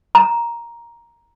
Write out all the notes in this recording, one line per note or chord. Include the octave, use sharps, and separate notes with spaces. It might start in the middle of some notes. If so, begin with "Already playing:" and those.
A#5